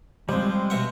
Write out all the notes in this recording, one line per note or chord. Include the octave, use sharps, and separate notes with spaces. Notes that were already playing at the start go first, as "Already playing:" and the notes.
F3 G3 G#3 C4
B2 E5 F#5